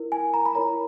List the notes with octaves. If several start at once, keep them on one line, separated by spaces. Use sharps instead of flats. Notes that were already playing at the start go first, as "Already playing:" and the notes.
Already playing: E4 A#4
G#5
A#5
B5
E4 A#4 C#5 A#5